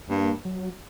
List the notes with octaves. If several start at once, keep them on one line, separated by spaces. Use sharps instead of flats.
G2 A#3
F#3